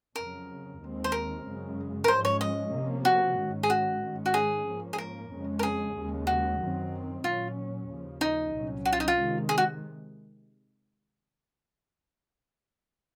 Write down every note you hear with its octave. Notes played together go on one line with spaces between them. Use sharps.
F2 C#3 F#3 A#4
D#2 D#3 G#3 C4
C5
A#4
F#2 C#3 G#3
A#4
G#2 F3 G#3 C#4 C5
C#5
D#5
C3 F3 A#3 C#4
F#4
G#2 D#3 G#3 C#4
G#4
F#4
G#2 D#3 G#3 C#4
F#4
G#4
G#2 F3 A#3 C#4
G#4
A#4
F2 C#3 G#3 C#4
A#4
G#4
D#2 C#3 G#3
F#4
F#2 D#3 F#3 C4
A#2 F#3 C#4 F4
D#2 C#3 F3
D#4
C2 A#2 F#3 C#4
F#4
F4
D#4
F4
C3 D#3 G#3
G#4
F#4